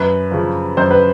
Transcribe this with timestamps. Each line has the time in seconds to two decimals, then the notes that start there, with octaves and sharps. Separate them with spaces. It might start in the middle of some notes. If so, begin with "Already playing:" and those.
Already playing: F#2 B4
0.31 C#3 F3
0.77 F#2 C5
0.91 B4